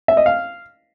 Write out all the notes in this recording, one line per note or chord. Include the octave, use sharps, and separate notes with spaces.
E5
D#5
F5